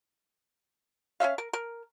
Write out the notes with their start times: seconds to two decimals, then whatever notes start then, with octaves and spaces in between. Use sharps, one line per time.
1.20 C#4 F4 E5 F5
1.38 A#4
1.53 A#4